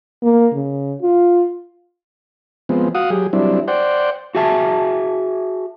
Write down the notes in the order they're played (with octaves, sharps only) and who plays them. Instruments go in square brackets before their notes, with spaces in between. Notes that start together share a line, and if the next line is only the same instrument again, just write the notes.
[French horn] A#3
C#3
F4
[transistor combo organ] F3 G#3 B3 C4
F#4 F5 F#5 D#6
F#3 G4 G#4
F#3 G3 C4 D4 E4
C5 D5 F#5 G5
[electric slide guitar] F#4 G#4 E5 A5